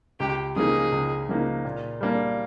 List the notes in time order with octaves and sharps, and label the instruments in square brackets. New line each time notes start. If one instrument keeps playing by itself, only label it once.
[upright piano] C#2 [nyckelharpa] G4
[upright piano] C#3 F3 A#3 D#4 [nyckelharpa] G#4
[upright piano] C#2
C#3 F3 A#3 D#4
A#2
G3 A#3 D4